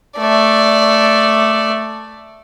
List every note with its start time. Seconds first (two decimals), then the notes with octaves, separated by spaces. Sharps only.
0.18 A3 D5